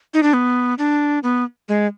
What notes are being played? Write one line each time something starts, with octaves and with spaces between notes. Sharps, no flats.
D#4
D4
B3
D4
B3
G#3